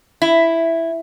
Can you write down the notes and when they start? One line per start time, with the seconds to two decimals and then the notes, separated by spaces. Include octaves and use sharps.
0.22 E4